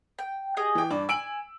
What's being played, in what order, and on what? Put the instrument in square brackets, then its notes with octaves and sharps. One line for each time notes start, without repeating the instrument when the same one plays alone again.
[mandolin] G5
G4 G#4 D#5
[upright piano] E3 G5
[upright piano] G2 D4 [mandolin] D6
[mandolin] G#5 [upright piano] E6 D7 F#7